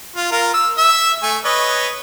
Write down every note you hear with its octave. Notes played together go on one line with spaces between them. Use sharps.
F4
F4 A#4
E6
E5 E6
A3 G#5
B4 C#5 D#5